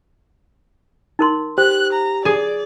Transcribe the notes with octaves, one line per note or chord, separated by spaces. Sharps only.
D#4 A#4 C6
G4 C5 F#6
A#5
G#4 D5